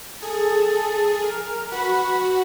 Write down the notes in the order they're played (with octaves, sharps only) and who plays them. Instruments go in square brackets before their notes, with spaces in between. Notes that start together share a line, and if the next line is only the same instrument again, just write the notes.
[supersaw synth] G#4 [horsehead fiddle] A4
[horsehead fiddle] A#4
[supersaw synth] F#4 [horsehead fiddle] B4